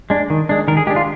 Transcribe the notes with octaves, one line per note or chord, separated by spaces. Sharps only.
G#3 D4
D#3
G#3 D4
D#3 A#4
G#4
G#3 D4 G4
F4